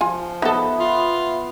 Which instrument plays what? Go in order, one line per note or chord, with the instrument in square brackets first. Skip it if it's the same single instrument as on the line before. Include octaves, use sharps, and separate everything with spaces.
[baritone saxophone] F3 [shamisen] F4 G#5
[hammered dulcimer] B3 [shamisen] D#4 A4 [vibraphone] E5
[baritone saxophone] F4